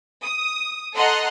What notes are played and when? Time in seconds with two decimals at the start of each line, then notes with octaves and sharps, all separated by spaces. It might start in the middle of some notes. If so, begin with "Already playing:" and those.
0.23 D#6
0.95 A4 D#5 F#5 A#5 C6 F#6